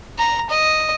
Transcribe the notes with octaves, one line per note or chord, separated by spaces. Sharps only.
A#5
D#5